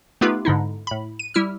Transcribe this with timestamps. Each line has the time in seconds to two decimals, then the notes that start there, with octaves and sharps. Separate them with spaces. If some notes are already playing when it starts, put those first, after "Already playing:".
0.21 A3 B3 D#4 F4 G4 B4
0.45 G#2 D3 D#4 E4
0.87 A2 B5
1.19 D#7
1.34 G3 E4 E6 F6